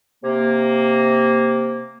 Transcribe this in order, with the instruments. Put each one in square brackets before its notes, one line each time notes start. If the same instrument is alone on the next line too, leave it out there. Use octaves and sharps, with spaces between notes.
[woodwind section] C3 A#3